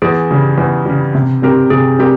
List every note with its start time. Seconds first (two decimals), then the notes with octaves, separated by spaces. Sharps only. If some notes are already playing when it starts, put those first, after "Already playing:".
0.02 E2 G#4
0.31 C#3 G3
0.58 E2
0.86 C#3 G3
1.15 C3
1.42 G3 C4 G4 A#4
1.70 C3 G#4
1.99 G3 C4 G4 A#4